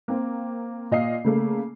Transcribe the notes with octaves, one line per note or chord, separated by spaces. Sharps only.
A#3 C4
A#2 D#5 F5 C7
C#3 A3 A#3